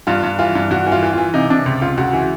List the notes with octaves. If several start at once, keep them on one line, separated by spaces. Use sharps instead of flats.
G2 F4
G2
E3 F4
G2
G2 F#4
E3
F4
E3
E3 F4
C3 D#4
C3 D4
C#2
C#2 F4
C#2 F#4
E3